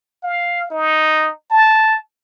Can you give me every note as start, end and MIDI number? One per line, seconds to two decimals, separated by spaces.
0.23 0.70 77
0.70 1.30 63
1.51 1.97 81